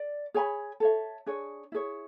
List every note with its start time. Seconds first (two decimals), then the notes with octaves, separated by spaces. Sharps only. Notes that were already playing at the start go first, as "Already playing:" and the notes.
Already playing: D5
0.34 G#4 C#5 G#5 B5
0.80 A4 C#5 E5
1.26 D4 G#4 C#5
1.72 E4 G#4 C#5